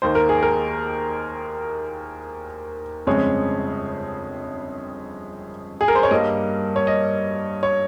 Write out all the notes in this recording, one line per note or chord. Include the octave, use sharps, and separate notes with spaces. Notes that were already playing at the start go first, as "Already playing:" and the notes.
D#2 D#3 A#3 C5
A#4
G#4
A#4
G1 F2 C#3 G#3 C4 C#5
G#4
A#4
C5
C#5
G2 G3 A#3 D#5
C#5
D#5
C#5